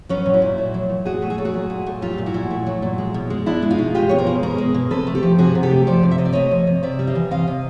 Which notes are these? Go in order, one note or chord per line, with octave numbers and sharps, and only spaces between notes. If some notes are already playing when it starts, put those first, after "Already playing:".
F#3 B3 C#4
A#2
E4 F#4
A#2
A3
F#3
A#2
A#2 F#4 G#4
A3
G#4
F#3 A4
F#4 G#4
A#2
A#2
A3
F#3 F4 G4
A#2
E4 F#4
A#2
A3
F#3
A#2
G#3
B2
G#3
B2 D4 E4
G#3
D#4 F4
B2
G#3 F4 G4
B2 C#5
A#4 C5
G#3
B2 G#4 A#4
G#3
B2
C3 A4 B4
A3
G4 A4
F3
C3 F#4 G#4
C3
G4 A4
A3
F3 C5 D5
C3
E5
C3 D#5
D5
A3 C#5 D#5
F3
C3
C3 D5 E5
G3
D#5 F5
E3
C3 D#5 F5
C3